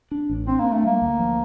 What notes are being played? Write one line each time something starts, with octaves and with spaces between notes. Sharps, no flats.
D4
A1
C4 D4
A#3
D4
A3
G3 A#3
D2
F3